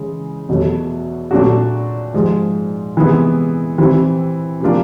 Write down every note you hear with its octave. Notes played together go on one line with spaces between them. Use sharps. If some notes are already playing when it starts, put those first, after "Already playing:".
Already playing: C#3 E3 G#3
E2 B2 F#3 A3
A#2 F#3 A3 D4 F#4
G#2 F3 G#3
C3 E3 G#3 B3
E3 G3 C4
C3 F3 A#3 D4 F4